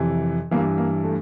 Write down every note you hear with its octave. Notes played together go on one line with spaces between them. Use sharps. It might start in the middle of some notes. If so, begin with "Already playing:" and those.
Already playing: F2 C3 E3
G2 E3 A#3
A#3
A3